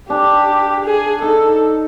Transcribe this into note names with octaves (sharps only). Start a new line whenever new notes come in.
D4 G4
G#4
D#4 A4